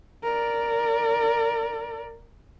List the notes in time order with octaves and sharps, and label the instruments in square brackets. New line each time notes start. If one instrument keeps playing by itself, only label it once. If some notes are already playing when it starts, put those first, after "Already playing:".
[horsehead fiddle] A#4 D5